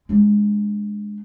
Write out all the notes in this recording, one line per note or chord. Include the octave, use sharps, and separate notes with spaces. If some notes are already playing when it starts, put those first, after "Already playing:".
G#3 D4